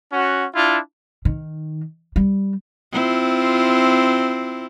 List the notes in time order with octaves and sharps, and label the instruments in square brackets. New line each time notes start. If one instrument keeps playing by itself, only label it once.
[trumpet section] C#4 F#4
D4 E4 F4
[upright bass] D#3
G3
[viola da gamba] C4 E4 F4